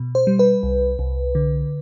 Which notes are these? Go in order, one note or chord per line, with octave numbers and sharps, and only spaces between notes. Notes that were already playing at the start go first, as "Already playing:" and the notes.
Already playing: B2
C5
G3
B4
C2
C2
D3